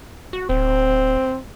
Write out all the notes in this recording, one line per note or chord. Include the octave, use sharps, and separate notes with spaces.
F#4
D1 C4